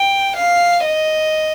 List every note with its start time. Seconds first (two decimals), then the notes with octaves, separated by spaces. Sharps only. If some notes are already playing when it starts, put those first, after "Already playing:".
Already playing: G5
0.36 F5
0.85 D#5